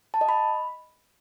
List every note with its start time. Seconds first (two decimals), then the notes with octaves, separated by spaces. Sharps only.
0.14 A5
0.21 D#5
0.29 B5